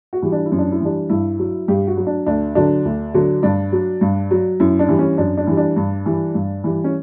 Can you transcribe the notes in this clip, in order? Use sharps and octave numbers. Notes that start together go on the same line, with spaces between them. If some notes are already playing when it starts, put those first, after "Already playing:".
F#4
E3 G3
D4
E4
F#2
D4
E4
E3 G3 D4
G2 E4
F#3
G2 G4
F#4
F#3
D4
D2 D4
D3 F#3 D4
D2
D3 F#3
G2 D4
F#3
G2
F#3
F#2 E4
D4
E3 G3
C#4
F#2 D4
D4
E3 G3
D4
G2
E3 G3
G2
E3 G3
C#4